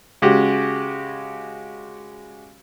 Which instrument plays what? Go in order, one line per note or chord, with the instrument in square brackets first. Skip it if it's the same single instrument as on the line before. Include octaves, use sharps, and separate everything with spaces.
[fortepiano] C#3 G#3 F#4 G4